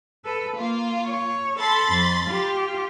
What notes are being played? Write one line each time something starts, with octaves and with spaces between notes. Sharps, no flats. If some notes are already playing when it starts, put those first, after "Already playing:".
A4 B4
A#3 F4
C#5
A4 B5 C6 A6
F2
F4 G4